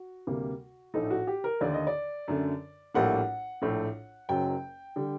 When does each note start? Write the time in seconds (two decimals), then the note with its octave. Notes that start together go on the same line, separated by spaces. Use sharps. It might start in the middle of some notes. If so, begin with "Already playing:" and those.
Already playing: F#4
0.27 D2 C3 G3 A#3
0.94 A#1 A2 A3 D#4
1.10 F#4
1.27 G4
1.44 A#4
1.61 D#2 D3 A3 D5
1.74 D#5
1.87 D5
2.28 F#2 D3 A3
2.94 A#1 A2 G3 A#3 F#5
3.62 A#1 A2 A3
4.29 F#1 F#2 F#3 G5
4.96 D3 G3